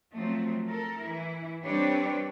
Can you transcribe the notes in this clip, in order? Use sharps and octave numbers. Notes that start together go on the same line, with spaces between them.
F3 F#3 A3 C4
A4 A#4
E3 E4
G3 C4 D4 G4 B4 C#5